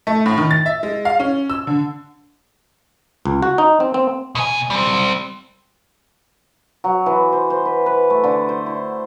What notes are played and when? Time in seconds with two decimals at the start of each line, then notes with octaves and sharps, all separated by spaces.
0.07 A3
0.26 A2
0.38 D#3
0.51 A6
0.66 E5
0.83 G#3
1.05 F5
1.20 C#4
1.50 E6
1.67 D3
3.25 C#2
3.43 F#4
3.58 D#4
3.80 C4
3.94 C4
4.35 B2 G#5
4.70 G3 C4
6.84 F#3
7.06 E3
7.32 C5
7.50 C5
7.66 B4
7.86 B4
8.10 A3
8.23 D3
8.49 C5
8.66 E4